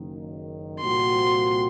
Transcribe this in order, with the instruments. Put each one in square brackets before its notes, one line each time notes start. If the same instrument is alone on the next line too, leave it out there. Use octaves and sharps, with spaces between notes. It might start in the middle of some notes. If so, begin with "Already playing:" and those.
Already playing: [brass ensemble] F#1 F#2 D#3
[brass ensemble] C2 A#2 F3 C4 F#4 [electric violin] C6